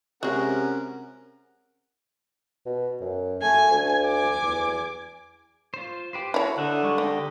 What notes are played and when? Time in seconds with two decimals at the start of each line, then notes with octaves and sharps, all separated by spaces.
0.23 C3 G#3 C#4 F#4 A#4 F#5
2.66 B2
3.01 F#2
3.42 A3 G#5
3.71 D2
4.03 G#5 D6
4.43 E2
5.74 F4 C5
6.13 G4 B4 C5
6.34 E4 F#4 C#5
6.58 D3 D#4 E5 F#5
6.83 G3 G#3 C#6
6.98 D#4 G4 D#5